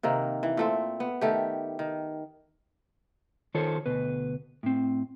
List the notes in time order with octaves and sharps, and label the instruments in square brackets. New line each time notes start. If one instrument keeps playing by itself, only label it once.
[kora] C3 D#3 A#3
E3
A#2 A3 C4
B3
D#3 A3 G4
D#3
[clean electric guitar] D#3 F4 A4 C5 C#5
D2 B2 B4
A2 C4